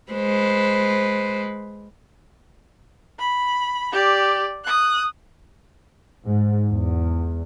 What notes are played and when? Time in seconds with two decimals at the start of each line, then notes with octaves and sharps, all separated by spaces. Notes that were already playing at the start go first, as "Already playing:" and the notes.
0.12 G#3 B4 C5
3.19 B5
3.92 G4 D5
4.64 D#6 F#6
6.25 G#2
6.69 E2